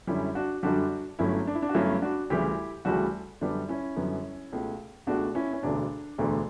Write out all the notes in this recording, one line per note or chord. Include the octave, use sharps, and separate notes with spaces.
F#2 D3 G3 C#4 E4
D4 F#4
F#2 D3 G3 D4 F#4
G1 G2 F#3 A3 C#4 E4
D4
E4
D4
F#4
G1 G2 F#3 A3 C#4 E4
D4 F#4
D2 C#3 E3 G3 E4 G4
D2 C#3 E3 G3 F#4 A4
F#2 D3 G3 B3 D4
C#4 E4
F#2 D3 G3 B3
C#2 B2 A3
C#2 B2 A3 D4 F#4
C#4 E4
C#4
E1 D2 D3 D4
E1 D2 D3